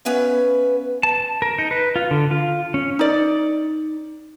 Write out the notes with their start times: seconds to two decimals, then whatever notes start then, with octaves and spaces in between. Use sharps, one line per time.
0.05 B3 C#4 B4 E5 F5
1.03 A5
1.42 A#4
1.58 D#4
1.71 B4
1.96 F4
2.11 D3
2.31 F4
2.74 C#4
2.99 D#4 D5